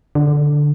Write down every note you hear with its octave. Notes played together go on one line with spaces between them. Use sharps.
D3